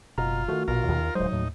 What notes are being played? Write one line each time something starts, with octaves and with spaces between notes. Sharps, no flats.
F#1 B2 F4 A#5
D#3 F3 A3 F#4
A#1 B2 F4 A#4
D#2 D#3
D1 F#3 G#3 D#4 C5
D#2 A2